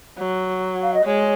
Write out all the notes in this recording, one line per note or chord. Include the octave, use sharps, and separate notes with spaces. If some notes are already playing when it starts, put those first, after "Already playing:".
F#3
F5
D#5
G#3 C#5